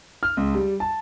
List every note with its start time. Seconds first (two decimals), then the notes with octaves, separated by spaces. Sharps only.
0.23 F6
0.37 C#2
0.54 G3
0.80 A5